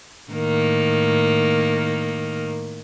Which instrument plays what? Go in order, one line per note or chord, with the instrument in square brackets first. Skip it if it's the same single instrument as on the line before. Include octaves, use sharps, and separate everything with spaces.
[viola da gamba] A2 D#3 A#3